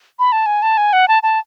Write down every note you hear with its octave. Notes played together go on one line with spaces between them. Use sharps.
B5
A5
G#5
A5
G#5
F#5
A5
A5